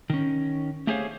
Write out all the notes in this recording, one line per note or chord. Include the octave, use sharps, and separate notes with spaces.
D#3 C#4
A3 G4 G#4 C5 C#5 F5